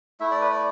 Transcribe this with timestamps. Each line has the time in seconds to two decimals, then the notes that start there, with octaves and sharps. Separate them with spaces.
0.20 A3 E4 E5
0.31 D5
0.41 B4
0.51 D5